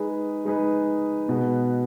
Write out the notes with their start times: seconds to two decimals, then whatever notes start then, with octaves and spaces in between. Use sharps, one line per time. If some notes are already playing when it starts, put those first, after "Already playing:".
Already playing: G#3 D#4 G#4 B4
0.45 G#3 D#4 G#4 B4
1.29 B2 G#3 B3